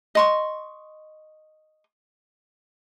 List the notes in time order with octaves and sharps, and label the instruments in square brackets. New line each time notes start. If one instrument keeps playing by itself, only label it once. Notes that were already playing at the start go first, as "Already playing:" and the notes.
[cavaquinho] D#5 C6 C#6